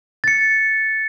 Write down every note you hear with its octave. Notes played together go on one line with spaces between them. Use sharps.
A6 C#7